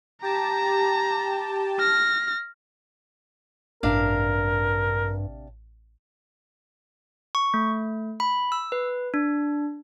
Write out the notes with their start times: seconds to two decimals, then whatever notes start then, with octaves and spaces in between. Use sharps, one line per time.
0.22 G4 A5 A#5
1.79 F6 A#6
3.83 A1 G2 C3 D4 A#4 F5
7.35 C#6
7.54 A3
8.20 B5
8.52 E6
8.72 B4
9.14 D4